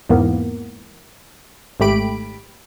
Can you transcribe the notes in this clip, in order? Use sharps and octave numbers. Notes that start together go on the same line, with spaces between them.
E2 G#2 E3 A#3 B3
G#1 G#2 A3 G4 B5 D7